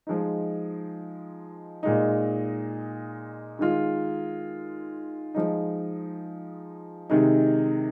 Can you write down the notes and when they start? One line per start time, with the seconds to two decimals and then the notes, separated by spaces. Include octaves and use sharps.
0.07 F3 G#3 D#4
1.83 A#2 G#3 D#4
3.59 D#3 G#3 F4
5.35 F3 G#3 D#4
7.10 C3 D#3 G#3 D#4